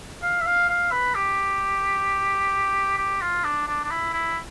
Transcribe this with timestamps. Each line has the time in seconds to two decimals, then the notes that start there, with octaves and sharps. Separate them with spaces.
0.22 F5
0.41 E5
0.46 F5
0.69 F5
0.92 B4
1.15 G4
2.98 G4
3.22 F4
3.44 D4
3.68 D4
3.84 D4
3.91 E4
4.13 E4